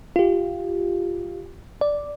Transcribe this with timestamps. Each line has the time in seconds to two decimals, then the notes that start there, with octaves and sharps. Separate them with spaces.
0.16 F4 G4
1.81 D5